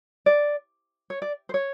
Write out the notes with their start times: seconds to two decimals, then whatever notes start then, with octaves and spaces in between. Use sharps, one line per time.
0.26 D5
1.10 C#5
1.22 D5
1.49 C5
1.54 C#5